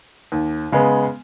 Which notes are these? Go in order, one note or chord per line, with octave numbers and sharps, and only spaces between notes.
D#2
C#3 G#3 B3